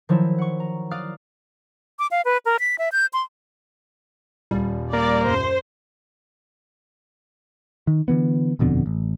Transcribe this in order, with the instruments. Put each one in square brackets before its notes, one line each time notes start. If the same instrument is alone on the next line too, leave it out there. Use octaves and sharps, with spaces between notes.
[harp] D#3 F3 F#3 E4
F#5 C#6
A#5
D5 F5 D#6 F6 F#6
[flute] D6
F5
B4
A#4
B6
E5
G6
C6
[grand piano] D#1 [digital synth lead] G3
[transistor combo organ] A#3 [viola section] D5
[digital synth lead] F#2 [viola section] C5
[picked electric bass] D#3
D3 E3 B3
D#1 F2 B2 D3
A1